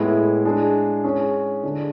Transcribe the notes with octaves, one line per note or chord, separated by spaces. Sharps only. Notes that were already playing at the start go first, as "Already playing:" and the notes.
Already playing: A2 G#3 B3 E4
G#3 D4 G#4
G#3 C#4 G#4
D3 G#3 D4